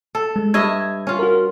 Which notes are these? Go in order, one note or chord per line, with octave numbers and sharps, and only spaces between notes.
A4
G#3
G2 D#5 E5 G#6
C#4 F4
F#4 A#4